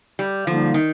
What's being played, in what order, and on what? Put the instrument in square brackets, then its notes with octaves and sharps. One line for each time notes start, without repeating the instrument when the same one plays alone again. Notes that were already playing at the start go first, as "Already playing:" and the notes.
[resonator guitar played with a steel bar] G3
[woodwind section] D3 G3 A#3 D#4 [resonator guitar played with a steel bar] F3
[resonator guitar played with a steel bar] D#3